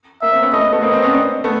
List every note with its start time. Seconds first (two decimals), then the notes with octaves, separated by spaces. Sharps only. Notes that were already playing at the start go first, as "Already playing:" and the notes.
0.22 A#3 E5
0.32 A#3 C4
0.42 B3 C#4
0.53 A3 B3 D#5
0.73 A3 B3
0.83 A#3 C4 D#5
0.93 A#3 C4
1.03 B3 C#4
1.13 C4 D4
1.44 A3 B3